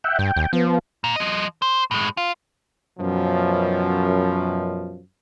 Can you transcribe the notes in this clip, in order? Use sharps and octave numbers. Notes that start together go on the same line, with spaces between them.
E5 F#5 G5
G2 G5
D#2
F3 B3
A#2
F3 D#5
C5
A2 G#3
F4
F#2 B2 F3